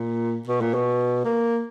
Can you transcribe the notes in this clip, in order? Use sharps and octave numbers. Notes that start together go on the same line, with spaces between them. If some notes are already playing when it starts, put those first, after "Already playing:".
Already playing: A#2
B2
A#2
B2
A#3